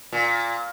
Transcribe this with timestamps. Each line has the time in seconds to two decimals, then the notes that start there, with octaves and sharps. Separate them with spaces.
0.13 A#2